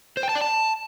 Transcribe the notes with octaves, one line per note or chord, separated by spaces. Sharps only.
C5
G5
A5
D5
A5